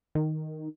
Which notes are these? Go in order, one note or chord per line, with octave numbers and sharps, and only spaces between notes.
D#3